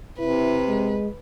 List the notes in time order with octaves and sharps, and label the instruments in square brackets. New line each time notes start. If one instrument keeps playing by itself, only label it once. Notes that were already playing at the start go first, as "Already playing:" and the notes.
[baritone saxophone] C3 [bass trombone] E4 [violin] B4
[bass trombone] G#3